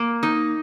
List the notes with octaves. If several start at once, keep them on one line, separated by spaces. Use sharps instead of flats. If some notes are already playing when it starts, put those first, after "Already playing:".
Already playing: A#3
D#4